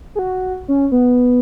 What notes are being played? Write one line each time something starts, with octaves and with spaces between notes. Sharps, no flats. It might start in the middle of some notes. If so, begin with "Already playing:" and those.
G#4
F#4
C#4
B3